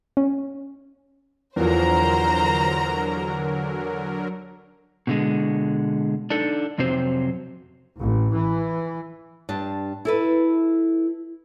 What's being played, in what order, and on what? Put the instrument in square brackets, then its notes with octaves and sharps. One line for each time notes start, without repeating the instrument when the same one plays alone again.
[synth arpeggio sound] C#4
[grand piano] E2 F3 [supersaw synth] D3 F#3 A#4 [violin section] C5 A#5
[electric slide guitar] B2 D3 G#3
D4 D#4 A4
F2 C3 F#3 C4 C5
[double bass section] A1
E3
[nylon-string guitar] G2 D4 A5
E4 A4 B4